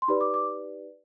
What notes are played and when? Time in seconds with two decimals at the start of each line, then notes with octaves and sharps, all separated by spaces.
0.02 C6
0.08 D#4 G4 B4 D5 B5
0.21 D6
0.34 D6